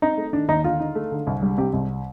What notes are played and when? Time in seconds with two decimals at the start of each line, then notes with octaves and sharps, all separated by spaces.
0.02 C4 D#4
0.17 A3
0.33 D#3 D4
0.48 D#2 D#4
0.64 D3 F4
0.80 D#4
0.95 A3
1.12 D3
1.27 C2
1.42 G3
1.58 C3 G4
1.73 C2